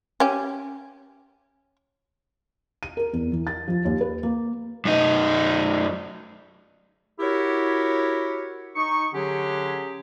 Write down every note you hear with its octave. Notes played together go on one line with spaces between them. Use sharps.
C#4 G4
D#7
A#4
E2
E3
A6
F3
D#2
B4
A#3
F#2 D#4
E4 F#4 G4 A#4 C#5
D#4 C#6
D3 F#3 C#4 G4 G#4